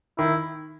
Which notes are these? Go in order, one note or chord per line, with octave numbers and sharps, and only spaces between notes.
D#3 E4